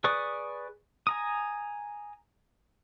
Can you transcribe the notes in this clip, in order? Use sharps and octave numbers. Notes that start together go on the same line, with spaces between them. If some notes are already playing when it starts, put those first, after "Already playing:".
G#4 B4 D5 C#6 D#6
G#5 A#5 D#6